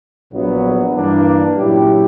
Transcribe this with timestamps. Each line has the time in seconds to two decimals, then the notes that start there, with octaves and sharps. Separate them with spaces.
0.32 A#1 A#2 F#3 B3
0.95 G2 E3 A#3 D4
1.56 A#2 F#3 C#4 E4 G4